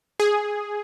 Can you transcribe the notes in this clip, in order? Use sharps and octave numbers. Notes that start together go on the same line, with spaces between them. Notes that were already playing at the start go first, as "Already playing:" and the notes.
G#4